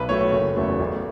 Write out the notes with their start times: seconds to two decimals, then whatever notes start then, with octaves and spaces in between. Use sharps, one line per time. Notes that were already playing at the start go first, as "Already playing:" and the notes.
Already playing: B1 B4
0.09 A2 F#3 A3 C#5
0.32 F#1
0.56 E2 C#3 F#3 A3
0.80 A1